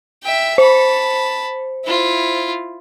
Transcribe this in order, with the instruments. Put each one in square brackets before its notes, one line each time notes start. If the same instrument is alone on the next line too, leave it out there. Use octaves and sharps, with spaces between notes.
[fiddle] E5 G5
[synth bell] C5 [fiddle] A5 B5
[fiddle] E4 F4